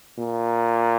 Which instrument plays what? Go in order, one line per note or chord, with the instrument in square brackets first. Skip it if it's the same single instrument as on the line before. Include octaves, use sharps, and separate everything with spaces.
[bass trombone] A#2